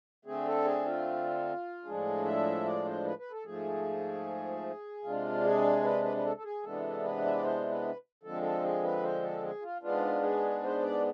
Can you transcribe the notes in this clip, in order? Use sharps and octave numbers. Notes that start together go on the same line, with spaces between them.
D3 A3 C4 G#4
A4
G#4
F4
A2 F3 G#3 D4 G#4
E5
D5
C5
B4
B4
A4
G#2 F3 A3 G#4
C3 G#3 D4 F4
G#4
B4
B4
B4
A4
A4
G#4
C3 E3 G#3 B3 D4 A4
B4
E5
D5
C5
B4
D3 F3 G#3 C4 A4
A4
G#4
B4
C5
A4
G#4
F4
G#2 G#3 B3 D4 F4
G#4
C5
D5